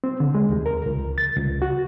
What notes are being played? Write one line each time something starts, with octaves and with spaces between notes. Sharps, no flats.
C4
D3
G#3
D#2
A#4
C#2
A6
C#2
F#4